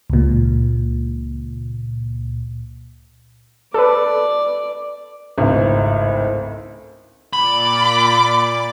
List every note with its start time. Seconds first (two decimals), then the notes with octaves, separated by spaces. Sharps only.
0.10 C#2 A#2
3.74 A4 B4 D5
5.38 G#1 C#2 A2
7.33 A#2 D5 B5 D6